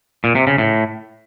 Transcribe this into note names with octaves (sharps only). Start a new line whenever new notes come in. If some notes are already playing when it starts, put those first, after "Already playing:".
A#2
C3
C#3
A2